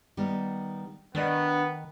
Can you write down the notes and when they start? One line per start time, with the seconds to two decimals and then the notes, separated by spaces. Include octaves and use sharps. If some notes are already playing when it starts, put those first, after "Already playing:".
0.17 D#3 G3 B3
1.15 D#3 B3 D4 D5 D#5